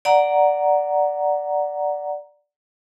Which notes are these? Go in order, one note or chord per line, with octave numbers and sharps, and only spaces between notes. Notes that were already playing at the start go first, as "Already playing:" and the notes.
D5 F#5 A#5